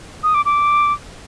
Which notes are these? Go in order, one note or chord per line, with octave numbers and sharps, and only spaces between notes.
D#6
D6
D6